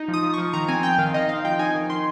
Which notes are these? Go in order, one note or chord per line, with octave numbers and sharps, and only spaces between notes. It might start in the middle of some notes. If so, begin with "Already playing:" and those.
Already playing: D#4
F3
D#6
F3
F3 C#6
D#3 A#5
C4 G#5
C4 G5
D#3 F5
D#4 D#5
C4 F5
F3 G5
D#4 G#5
D#3
D#3 C6